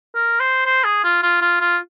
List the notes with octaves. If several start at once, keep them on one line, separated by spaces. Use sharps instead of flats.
A#4
C5
C5
G#4
F4
F4
F4
F4